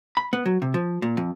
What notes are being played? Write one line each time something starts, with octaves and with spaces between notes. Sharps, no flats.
B5
B3
F#3
C3
F3
A#2
F2